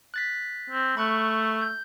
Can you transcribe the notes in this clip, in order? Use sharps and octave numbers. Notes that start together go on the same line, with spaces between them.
F#6 A6 B6
C4
A3 B5 C#6 F#6
G6